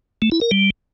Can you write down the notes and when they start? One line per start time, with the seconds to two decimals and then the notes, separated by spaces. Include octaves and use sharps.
0.22 A3
0.32 E4
0.41 A#4
0.51 G3